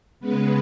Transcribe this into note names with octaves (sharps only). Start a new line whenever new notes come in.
C#3 G#3 B3 B4